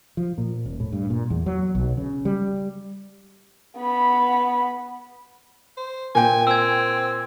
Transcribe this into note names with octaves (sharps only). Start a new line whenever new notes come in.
F3
A#2
D#1
A2
G2
A#2
E2
F#3
B1
C#3
G3
B3 B5
C5
A#2 G5 G#5
C4 E6 G#6